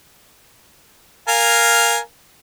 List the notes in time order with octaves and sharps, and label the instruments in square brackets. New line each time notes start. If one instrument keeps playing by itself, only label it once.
[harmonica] A#4 F5 G#5